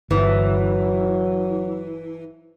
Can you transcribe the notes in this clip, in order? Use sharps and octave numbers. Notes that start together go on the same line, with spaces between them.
G1 E3 F#3